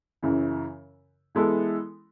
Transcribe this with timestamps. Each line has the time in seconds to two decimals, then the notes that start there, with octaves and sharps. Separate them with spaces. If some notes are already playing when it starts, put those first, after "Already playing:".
0.23 F#2 C#3 E3
1.35 E3 G#3 B3 E4 A4